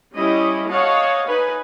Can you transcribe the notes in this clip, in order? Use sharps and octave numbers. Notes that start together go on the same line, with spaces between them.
G3 C#4 E4 G4 D#5
C#5 D#5 F5 F#5 A5
D#4 B4 G#5